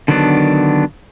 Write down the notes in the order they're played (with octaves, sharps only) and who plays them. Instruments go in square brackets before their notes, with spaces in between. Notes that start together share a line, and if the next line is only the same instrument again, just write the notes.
[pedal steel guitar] D3 D#3 F#3 B3 D4